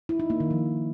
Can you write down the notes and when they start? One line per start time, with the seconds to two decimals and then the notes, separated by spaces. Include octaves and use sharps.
0.09 E4
0.20 D#4
0.30 A#3
0.40 D#3
0.51 F3